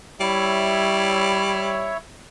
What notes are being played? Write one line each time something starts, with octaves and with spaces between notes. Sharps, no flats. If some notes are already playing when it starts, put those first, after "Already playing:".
G3 E4 C#5 E5